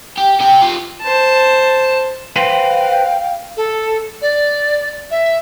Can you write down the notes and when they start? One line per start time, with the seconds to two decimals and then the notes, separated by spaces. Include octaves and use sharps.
0.17 G4
0.40 C3 G5
0.62 F4 G4
1.02 C5 A5
2.36 B4 C5 F5 G5 G#5
3.57 A4
4.22 D5
5.11 E5